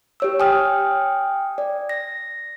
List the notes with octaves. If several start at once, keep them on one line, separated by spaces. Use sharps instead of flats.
G4 C#5 E6
G5 G#5 D#6 F6
D5
A#6